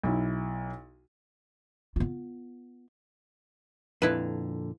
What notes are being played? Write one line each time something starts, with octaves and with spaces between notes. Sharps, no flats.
B1 E4
B3 F4
F2 A#2 D3 E4 B4